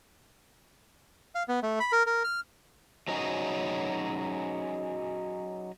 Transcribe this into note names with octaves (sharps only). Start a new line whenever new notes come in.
F5
B3
A3
B5
A#4
A#4
F6
F#3 C#4 D#4 F#4 G#4